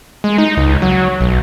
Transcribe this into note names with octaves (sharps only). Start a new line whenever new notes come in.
G#3
D#4
C#2
F#3
B1